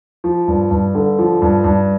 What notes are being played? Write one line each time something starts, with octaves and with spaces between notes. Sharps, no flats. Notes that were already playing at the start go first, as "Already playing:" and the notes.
F3
G2
G2
D3
F3
G2
G2